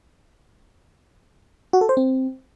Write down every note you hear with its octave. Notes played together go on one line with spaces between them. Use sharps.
F#4
A4
C5
C4